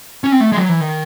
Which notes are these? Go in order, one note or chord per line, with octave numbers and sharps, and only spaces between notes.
C#4
C4
A3
G#3
F#3
E3
D#3